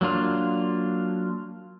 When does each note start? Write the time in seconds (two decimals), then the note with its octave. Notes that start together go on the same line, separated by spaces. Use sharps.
0.01 F#3 A#3 D4 F4